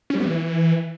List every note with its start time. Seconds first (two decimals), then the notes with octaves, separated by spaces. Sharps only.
0.10 C#4
0.15 G3
0.20 B3
0.25 E3